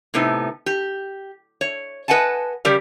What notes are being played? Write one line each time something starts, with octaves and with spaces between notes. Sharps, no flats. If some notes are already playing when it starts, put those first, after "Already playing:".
A2 C3 B3 D#4
G4
C#5
B4 D#5 F#5 G#5 A5
C#3 G3 G4 A#4 D5